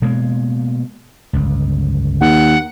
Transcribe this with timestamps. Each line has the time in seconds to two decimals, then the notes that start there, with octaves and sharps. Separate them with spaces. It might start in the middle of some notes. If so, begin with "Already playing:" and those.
0.02 B2 G#3 A#3
1.33 G1 C#2
2.21 D#2 F#5